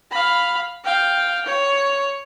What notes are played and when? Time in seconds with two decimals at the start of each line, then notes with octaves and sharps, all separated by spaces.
0.10 F5 B5
0.84 F5 G5
1.46 C#5